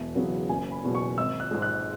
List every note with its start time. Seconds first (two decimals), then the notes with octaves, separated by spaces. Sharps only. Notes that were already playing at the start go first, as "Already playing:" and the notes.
Already playing: E1 E5
0.15 E2 C#3 F#3 B3
0.49 F#1 G#5
0.72 B5
0.83 E2 B2 F#3
0.95 C#6
1.17 G#1 E6
1.40 F#6
1.51 G#2 G#3
1.62 F#6